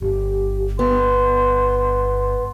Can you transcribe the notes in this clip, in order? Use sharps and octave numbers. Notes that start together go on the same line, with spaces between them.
G1 G4
B3 C6